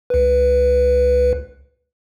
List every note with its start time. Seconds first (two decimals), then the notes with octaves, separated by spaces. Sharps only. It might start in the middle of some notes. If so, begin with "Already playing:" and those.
0.10 C#2 B4